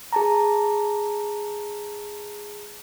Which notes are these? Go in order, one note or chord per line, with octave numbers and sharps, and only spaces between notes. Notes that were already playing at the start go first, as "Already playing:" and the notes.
G#4 A5 A#5